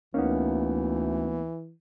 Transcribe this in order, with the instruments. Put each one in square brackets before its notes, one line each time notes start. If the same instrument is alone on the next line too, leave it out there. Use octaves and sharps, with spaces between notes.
[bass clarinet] D2 [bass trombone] E3 [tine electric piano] A#3 B3 [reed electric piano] C#4 D#4